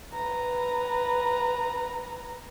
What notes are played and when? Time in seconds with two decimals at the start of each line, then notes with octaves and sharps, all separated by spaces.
0.14 B4 A#5